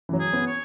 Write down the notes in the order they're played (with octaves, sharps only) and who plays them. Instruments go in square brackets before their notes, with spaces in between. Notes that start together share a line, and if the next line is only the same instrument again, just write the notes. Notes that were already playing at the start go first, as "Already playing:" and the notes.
[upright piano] E3
F#3
[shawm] G#4
[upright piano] B3
[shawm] C#5